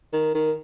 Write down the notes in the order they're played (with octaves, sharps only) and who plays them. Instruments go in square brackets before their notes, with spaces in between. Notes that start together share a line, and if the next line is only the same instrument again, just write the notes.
[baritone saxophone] D#3
D#3